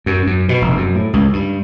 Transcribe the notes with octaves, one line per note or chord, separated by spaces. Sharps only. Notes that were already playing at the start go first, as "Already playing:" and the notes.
F#2
F#2
B2
F1
F#2
A2
C#2
G2